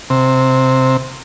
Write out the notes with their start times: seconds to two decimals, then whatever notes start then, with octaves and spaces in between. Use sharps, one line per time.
0.10 C3